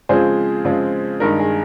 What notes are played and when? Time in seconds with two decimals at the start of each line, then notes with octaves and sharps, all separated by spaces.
0.09 C#3 F3 G#3 C4 F4 G#4 C5
0.65 C#3 F3 G#3 C4 F4
1.20 G2 D#3 G#3 D#4 A#4
1.39 G#4